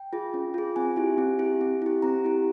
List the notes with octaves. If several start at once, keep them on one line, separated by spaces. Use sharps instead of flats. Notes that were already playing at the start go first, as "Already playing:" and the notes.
Already playing: G5
F4 G#4
C#4
F4 G#4
C4 G#5
E4 G4
C4
E4 G4
C4
E4 G4
C4 A#5
E4 G4